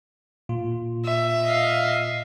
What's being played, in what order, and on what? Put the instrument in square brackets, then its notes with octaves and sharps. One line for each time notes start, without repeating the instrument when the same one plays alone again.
[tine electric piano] A#2 F4
[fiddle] E5
[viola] D#5 F5